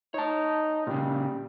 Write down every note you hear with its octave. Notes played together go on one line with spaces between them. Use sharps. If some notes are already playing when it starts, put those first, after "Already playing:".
D#4 C#5 A5
A#2 C#3 G3